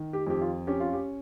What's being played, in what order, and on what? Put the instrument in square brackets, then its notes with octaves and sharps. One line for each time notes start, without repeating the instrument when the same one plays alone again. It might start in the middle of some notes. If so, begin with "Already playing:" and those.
Already playing: [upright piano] D#3
G4
F2 G4
F4
C#4 G4
F4
G4